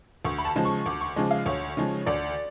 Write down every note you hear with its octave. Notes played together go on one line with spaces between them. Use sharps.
D2 C#6
B5
A5
C#3 F3 G#3
C#6
D2 D6
C#6
C#3 F3 G#3
F5
D2 C#5
C#3 F3 G#3
D2 D5